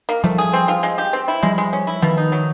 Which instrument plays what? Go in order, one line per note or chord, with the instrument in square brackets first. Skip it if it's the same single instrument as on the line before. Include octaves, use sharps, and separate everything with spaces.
[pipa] A#3
[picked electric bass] F3 G3 [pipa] A3
[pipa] G#4
C4
F4
G#3
G4
C4
E4
[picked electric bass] F3 G3 [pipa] G#3
[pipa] G#3
C#4
E4
[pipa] B2 [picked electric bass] D#3 F3
[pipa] D#4
F#3